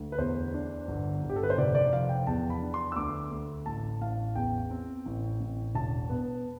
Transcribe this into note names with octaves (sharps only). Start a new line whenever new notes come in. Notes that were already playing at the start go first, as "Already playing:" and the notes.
Already playing: D2
B4
E2 C5
D4
G1
G1
G4
A4
B4
C5
F1 D5
D5
F3 F5
G5
E2 A5
B5
D4
C6
E6
D2 D6
D2
A1 A5
A1 F5
E2 G5
C4
A1
A1
E1 A5
B3